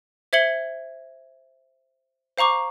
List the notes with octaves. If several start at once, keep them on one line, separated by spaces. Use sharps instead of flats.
C5 E5 G#6 C#7 F#7 G7
C5 F5 A#5 C#6 D6